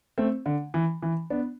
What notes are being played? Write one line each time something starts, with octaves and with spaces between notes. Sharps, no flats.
A3 C4
D3
E3
E3
B3 D4